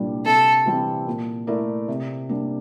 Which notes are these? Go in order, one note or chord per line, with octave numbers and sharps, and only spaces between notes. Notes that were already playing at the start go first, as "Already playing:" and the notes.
Already playing: C2 A#2 G3 D4
C3 A4
E3 G3 C4 E4
A#2
A3 E4 A#4 D5
C3
G3 A#3 D4